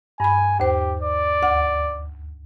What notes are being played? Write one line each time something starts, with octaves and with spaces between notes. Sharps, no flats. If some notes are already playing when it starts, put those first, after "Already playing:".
G2 G#5 B5
D#2 G4 C5
D5
D2 F#5 D6